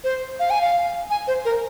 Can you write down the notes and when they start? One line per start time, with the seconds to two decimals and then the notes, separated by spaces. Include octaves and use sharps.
0.04 C5
0.40 F5
0.50 G#5
0.61 F5
1.10 G#5
1.27 C5
1.45 A#4